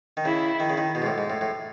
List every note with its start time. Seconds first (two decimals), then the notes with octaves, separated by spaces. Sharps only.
0.17 D#3
0.25 C#3 E4
0.60 D#3
0.70 C#3
0.77 D#3
0.95 B2
1.02 G#2
1.06 A2
1.18 G#2
1.30 A2
1.41 A2